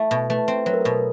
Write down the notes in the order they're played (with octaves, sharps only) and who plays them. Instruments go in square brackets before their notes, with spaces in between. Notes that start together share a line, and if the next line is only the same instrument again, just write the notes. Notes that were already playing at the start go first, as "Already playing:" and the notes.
Already playing: [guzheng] A3 E4
B2
[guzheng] A3 [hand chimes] B4
[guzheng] C4
[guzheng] F#3 [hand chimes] B4
[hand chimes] A#4
A4
[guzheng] B2 [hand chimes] A#4